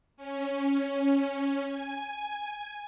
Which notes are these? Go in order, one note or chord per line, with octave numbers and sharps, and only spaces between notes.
C#4
G#5